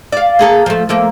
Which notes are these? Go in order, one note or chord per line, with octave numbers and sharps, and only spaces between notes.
D5 F5
A#3 G#4 A4
F3 A3
F3 A3 A#3